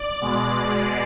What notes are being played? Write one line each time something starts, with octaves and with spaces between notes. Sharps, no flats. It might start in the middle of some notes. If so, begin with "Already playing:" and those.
Already playing: D5
B2 G#3